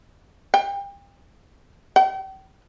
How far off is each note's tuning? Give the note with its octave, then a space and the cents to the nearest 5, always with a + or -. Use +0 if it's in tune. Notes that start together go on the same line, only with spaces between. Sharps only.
G5 +35
G5 -35